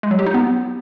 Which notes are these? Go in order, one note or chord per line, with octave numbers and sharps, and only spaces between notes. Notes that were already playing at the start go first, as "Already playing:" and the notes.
G#3
F#3
G4
D#4
B3